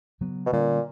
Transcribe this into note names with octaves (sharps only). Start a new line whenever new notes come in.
C#3 F#3 B3
B2
A#2 D3 G3 A#3 C#4